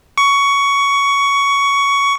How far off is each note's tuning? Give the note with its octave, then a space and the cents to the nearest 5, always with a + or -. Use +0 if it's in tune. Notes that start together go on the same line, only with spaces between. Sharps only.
C#6 +15